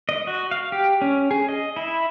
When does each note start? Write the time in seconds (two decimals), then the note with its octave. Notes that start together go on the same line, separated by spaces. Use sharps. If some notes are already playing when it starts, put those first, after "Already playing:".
0.09 D#5
0.27 F#4
0.51 F5
0.72 G4
1.02 C#4
1.31 G#4
1.49 D#5
1.76 E4